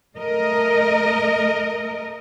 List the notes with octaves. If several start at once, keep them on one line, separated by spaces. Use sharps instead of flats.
A3 A#4 D#5